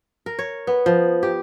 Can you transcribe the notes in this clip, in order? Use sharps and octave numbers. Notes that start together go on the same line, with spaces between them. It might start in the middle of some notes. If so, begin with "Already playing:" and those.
A#4
C#5
B3
F3
G4